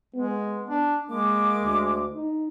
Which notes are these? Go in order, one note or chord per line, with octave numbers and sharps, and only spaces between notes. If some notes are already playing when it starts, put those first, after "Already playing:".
G#3 B3
D4
G#3 A#3 D6
D2
D#4